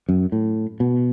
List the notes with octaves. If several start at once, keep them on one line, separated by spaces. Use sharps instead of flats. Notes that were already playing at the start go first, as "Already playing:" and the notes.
F#2
A2
B2